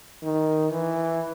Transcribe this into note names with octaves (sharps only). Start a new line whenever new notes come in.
D#3
E3